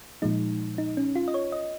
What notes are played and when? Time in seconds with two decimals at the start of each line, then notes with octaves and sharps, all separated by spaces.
0.22 A#2 F3 G#3 D#4
0.78 D#4
0.97 C#4
1.16 F4
1.28 D#5
1.34 C#5
1.52 D#5